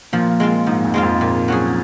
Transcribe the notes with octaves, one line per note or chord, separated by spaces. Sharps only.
A#2 F3
G#3 C4 F4
G#2 F3
F2
G#3 C4 F4
F2
A#2
F#3 C#4 G#4